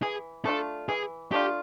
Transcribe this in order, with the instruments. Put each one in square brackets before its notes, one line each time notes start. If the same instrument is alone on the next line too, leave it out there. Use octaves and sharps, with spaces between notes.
[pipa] E3 [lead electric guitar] G#4
[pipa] A3 D4 F4 [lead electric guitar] A4
[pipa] E3 [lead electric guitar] G#4
[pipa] A3 D4 F4 [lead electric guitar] G4